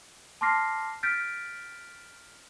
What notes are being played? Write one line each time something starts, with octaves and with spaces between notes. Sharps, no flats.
A5 C6 D6 F6 A#6 C7
F6 G6 A6 B6 D7